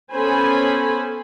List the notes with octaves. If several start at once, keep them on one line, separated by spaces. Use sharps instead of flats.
B3 C#4 A4 C5 G#5 B5